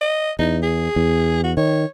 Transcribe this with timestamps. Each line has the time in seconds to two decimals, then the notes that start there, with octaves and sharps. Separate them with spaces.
0.01 D#5
0.39 E2 D#4
0.62 G#4
0.96 E2
1.44 F#4
1.57 D#3 C#5